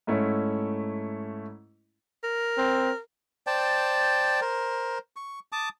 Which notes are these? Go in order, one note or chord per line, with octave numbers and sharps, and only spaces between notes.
G#2 A3 C#4 E4
A#4
C4
C5 D5 G5 A5
A#4 C5
C#6
A5 D6 D#6